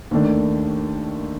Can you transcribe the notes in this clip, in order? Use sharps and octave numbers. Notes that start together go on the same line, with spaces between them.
D#2 D#3 A3 D4